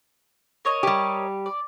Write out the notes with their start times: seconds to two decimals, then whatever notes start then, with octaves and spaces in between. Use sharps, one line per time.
0.65 A#4 C#5 D#5
0.83 G3 G4
1.46 D5